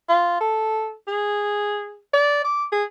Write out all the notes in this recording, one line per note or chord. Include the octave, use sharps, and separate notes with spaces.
F4
A4
G#4
D5
D6
G#4